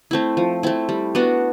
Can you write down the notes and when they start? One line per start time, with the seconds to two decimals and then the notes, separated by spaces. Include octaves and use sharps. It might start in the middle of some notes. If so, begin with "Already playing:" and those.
0.11 A3 C4 E4
0.37 F3
0.63 A3 C4 E4
0.89 G3
1.15 B3 D4 F#4